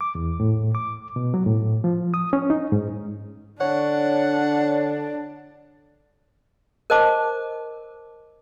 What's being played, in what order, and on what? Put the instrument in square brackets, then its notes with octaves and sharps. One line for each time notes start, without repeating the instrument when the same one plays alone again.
[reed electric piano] D6
E2
A2
D6
B2
F#3
A2
F3
D#6
C#4
D#4
G#2
[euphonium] D3 [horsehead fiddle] D4 [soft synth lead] C#5 [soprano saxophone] F#5
[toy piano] A#4 C5 D#5 A5 D6